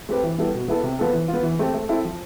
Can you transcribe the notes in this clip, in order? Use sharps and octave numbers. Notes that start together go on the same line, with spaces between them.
A3 C4 G4 B4
E3
G3 B3 E4 A4
B2
B3 E4 A4
C3
F3 B3 F4 A4
E3
F4
B3
E3
A3 C4 G4
A3
C4 E4 A4
F3